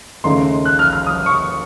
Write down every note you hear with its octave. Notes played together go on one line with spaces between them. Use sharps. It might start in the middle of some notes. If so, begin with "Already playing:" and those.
D#2 C#3 A3 D#4 C6
F#6
F6
F6
D#6
C#6